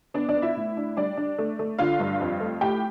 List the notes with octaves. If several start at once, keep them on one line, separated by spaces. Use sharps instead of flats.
B3 D4 D5
D4 D5
B3
E4 E5
A2
D4
G3 D4 D5
D4
A3
A3
D3 F4 F5
G2
F2
A3
A2 G4 G5